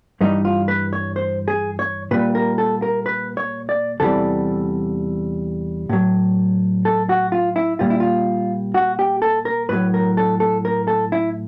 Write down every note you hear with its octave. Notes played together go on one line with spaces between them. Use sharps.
G2 E3 G3 D#4
F4
B4
C#5
C5
G#4
C#5
A#2 G3 B4
A#4
A4
A#4
B4
C#5
D5
E2 C3 E3 G3 A4
A2 F#3
A4
F#4
F4
E4
A#2 G3 F4
E4
F4
F#4
G4
A4
A#4
A2 F#3 B4
A#4
A4
A4
A#4
A4
E4